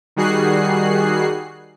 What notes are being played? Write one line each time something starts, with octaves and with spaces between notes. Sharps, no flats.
D#3 G3 F#4 G#4 F#6 C7